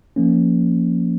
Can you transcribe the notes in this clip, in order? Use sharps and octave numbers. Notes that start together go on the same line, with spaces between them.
F3 A#3 C#4